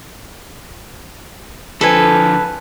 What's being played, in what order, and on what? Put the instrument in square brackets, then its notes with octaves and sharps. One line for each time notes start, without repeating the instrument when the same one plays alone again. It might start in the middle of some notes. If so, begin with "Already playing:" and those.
[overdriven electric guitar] D3 F3 [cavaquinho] A4 B4 G#5